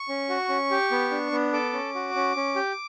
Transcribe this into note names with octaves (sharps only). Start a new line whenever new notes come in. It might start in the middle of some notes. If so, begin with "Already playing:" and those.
Already playing: C#6
C#4
F#4
C#4
G4
B3
D4
B3
A4 D6
C#4
F#4
C#4
C#4
G4